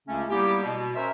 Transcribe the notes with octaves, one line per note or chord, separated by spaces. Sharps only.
C#2 C#3 A3 C#4
G3 A#3 B3 E4 G4
B2
C#4 A#4 C5 E5